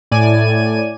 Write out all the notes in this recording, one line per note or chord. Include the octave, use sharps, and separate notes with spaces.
A2 D5 G#5 D#7